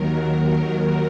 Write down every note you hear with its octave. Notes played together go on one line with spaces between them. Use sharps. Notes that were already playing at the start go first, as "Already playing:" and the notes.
Already playing: D#2 D#3 F#3 A#4